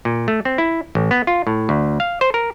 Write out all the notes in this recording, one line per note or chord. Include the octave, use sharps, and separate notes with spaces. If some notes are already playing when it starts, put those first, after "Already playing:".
A#2
A3
C4
E4
A1
B3
F4
A2
D2
F5
C5
A#4